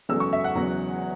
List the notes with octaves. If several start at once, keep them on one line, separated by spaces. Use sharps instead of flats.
E1 E2 C#3 F#3 A3 E6
C#6
E5
F#5
E1 E2 C#3 F#3